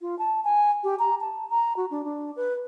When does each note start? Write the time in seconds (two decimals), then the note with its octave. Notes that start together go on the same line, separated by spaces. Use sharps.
0.01 F4
0.19 A5
0.44 G#5
0.84 G4
0.99 A#5
1.21 A5
1.50 A#5
1.76 F#4
1.91 D4
2.05 D4
2.36 B4